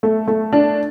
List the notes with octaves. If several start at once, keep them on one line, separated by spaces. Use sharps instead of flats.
A3
A3
D4